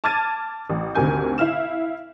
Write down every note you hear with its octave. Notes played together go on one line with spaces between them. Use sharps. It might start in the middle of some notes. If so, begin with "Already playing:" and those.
A5 D6 F6 G#6 A6 D#7
A1
G#1 D2 C3 A#4 G#5 G6
E4 F5 F6 E7